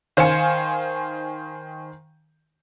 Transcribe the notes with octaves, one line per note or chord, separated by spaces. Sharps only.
D#3 C5 F5 G#5 C#7